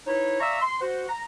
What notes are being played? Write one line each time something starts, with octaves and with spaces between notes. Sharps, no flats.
D#4 E4 B4 C#5
D5 E5 F5 A#5 C#6 E6
C6
F#4 C5 F#5
A#5